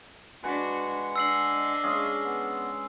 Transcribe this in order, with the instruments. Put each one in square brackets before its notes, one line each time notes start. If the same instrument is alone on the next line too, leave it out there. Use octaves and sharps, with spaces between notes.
[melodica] G#3 F#5 G#5 [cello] D4 F#4 [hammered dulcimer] B4
[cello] D4 D#5 [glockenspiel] E6 C7 F#7
[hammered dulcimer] G#3 C#4 G#4 [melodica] F5
[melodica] B3